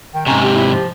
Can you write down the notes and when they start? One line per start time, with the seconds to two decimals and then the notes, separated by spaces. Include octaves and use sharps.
0.14 D#3 G5
0.27 G#2 C3 C#4 A#5
0.43 G4
0.55 E4
0.72 F3